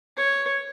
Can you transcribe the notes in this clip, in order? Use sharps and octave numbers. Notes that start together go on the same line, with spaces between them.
C#5